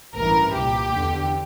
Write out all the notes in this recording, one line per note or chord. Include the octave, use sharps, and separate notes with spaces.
A1 G2 E3 A#4
C2 A#2 G4
E2 D3